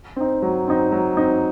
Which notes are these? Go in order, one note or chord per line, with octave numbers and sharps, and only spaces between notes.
C4 D#4
F#3
C4 D#4
F#3
C4 D#4